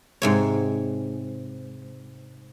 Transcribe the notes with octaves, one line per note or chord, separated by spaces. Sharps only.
G#2 C3 C#5